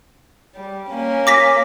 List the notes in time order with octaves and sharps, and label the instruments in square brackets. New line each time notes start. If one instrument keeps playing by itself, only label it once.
[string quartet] G3
A#3 C#4
[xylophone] D6 A#6 B6